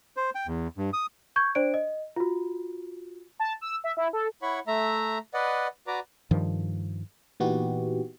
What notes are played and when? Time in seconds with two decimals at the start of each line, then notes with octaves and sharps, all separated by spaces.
0.17 C5
0.35 G5
0.47 E2
0.77 G2
0.93 D#6
1.36 C#6 G6 G#6
1.55 D4 C5 D5 D7
1.74 D#5
2.16 F4 F#4
3.40 A5
3.61 E6
3.84 E5
3.97 E4
4.13 A4
4.42 E4 C#5 F#5 B5 C#6
4.67 A3 E5 A#5
5.34 B4 D5 D#5 F#5
5.87 F#4 B4 D5 A#5 D6
6.31 G2 D#3 F3
7.40 A#2 E3 B3 D#4 F#4 G4